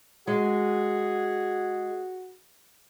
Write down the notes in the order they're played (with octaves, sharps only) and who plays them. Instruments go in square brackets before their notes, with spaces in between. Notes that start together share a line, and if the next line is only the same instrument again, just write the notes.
[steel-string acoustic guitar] G#3 [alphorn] F#4 [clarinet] G#4